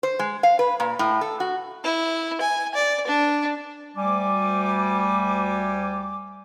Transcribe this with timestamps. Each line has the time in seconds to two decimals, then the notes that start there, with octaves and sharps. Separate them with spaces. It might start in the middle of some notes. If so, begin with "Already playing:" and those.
0.03 C5
0.19 G#3
0.43 F5
0.59 B4
0.80 A#2
0.99 A2
1.21 A4
1.40 F#4
1.84 E4
2.41 G#5
2.75 D5
3.07 D4
3.96 D2 G3 G#5 D6